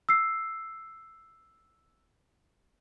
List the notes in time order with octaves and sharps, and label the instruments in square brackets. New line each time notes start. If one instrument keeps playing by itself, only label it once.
[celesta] E6 C7